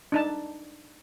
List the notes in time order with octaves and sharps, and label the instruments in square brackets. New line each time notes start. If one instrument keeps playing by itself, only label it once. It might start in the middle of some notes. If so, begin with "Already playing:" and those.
[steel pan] D4 D#4 A5